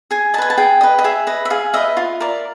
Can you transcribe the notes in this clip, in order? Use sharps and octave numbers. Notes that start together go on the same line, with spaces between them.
G#4 G#5
B4 D#5 G#5 A5
A5
G#4 G5
B4 D#5
D#5
G#4 E5
B4 D#5
E5
G#4 F5
B4 D#5 E5
F4
A#4 D5